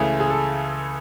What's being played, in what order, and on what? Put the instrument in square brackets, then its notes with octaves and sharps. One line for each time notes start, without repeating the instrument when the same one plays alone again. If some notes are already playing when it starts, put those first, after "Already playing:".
Already playing: [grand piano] C#2 C#3 E3 A3 [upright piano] G#4
[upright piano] G#4
A4